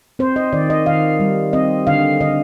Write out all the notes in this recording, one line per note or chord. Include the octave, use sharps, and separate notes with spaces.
C4 C5
D#5
D#3 D5
D#5
D#3 F5
G3
C4 D#5
D3 F5
D3 D#5